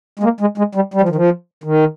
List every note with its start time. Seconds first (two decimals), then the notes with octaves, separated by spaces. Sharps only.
0.19 G#3
0.23 A#3
0.40 G#3
0.58 G#3
0.75 G3
0.94 G3
1.01 F3
1.09 D#3
1.15 F3
1.64 D#3